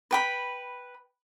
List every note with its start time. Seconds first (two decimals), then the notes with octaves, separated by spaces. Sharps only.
0.11 B4 G5 B5